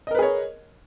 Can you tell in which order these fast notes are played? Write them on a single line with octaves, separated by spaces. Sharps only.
D#5 A#4 B4 G#4 C#5